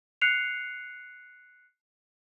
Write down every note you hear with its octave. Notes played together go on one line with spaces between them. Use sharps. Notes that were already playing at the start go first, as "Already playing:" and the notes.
F#6 C7 C#7 F7